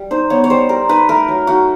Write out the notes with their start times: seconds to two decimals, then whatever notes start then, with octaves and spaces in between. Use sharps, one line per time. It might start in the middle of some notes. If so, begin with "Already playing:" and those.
Already playing: G3
0.11 D#4 C5
0.30 B3 C#5
0.44 C#5
0.50 G3 C5
0.69 G3 A#4
0.89 D#4 B4
1.09 A3 A#4
1.28 F#3
1.47 D#4 F#4